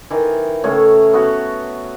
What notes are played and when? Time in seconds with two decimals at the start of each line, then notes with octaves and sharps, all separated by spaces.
0.10 D#3 E3
0.64 A2 C#3 A3 C#5
1.13 B3 F#4